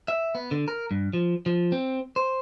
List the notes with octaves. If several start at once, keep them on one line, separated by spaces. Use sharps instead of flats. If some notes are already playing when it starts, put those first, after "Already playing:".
E5
B3
D3
A#4
G2
F3
F3
C4
C5